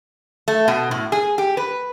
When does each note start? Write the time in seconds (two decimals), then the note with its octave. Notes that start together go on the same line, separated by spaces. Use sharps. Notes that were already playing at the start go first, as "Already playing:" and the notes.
0.48 A3
0.68 B2
0.91 A2
1.12 G#4
1.38 G4
1.57 B4